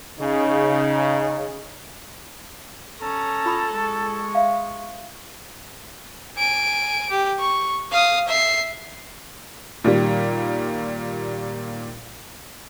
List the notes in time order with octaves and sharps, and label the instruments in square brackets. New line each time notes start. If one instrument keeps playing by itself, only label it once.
[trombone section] C#3 [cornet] D#4
[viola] C#4 A#5 [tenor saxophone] A4
[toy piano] F4 B5 D#6
[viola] G#3 C#6
[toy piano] E5 F5
[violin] G#5 D7
G4
C#6
F5 D#6
E5 C7
[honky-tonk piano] A#2 D#3 G3